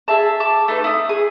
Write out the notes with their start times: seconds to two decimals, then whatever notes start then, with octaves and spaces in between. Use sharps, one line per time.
0.08 G#4 E5 A5
0.40 A5 D6
0.68 A3 D#4 B4
0.84 E4 D#6
1.09 G#4 D#6